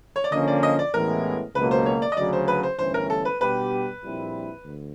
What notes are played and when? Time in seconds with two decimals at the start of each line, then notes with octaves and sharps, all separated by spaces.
0.16 C#5
0.24 D5
0.32 D3 F3 A#3 C#4 D#5
0.48 D5
0.63 D#5
0.79 D5
0.94 A1 A2 E3 G#3 B3 A#4
1.55 C#2 B2 F#3 A#3 B4
1.71 C5
1.86 C#5
2.02 D5
2.12 D#5
2.17 D2 C#3 F#3 D5
2.33 C5
2.48 B4
2.63 C5
2.79 G1 G2 E3 A3 C#4 C5
2.94 A#4
3.10 A4
3.25 B4
3.40 B2 G3 B3 D4 G4 B4
4.02 A#1 A#2 G3 C4 E4
4.64 D2